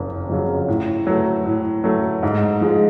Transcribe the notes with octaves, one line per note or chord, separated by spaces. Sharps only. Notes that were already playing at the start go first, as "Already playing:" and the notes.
Already playing: F#1 F2 C#3
F2 C#3 F#3
A2
F#3 A3
A2
F#3 A3
G#2
F3 G#3